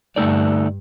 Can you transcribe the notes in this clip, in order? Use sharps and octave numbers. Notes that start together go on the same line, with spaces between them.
G2 D3 A3 D#4 A4 D5